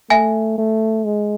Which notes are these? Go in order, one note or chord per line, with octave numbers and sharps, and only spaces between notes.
A3 E5 G#5
A3
G#3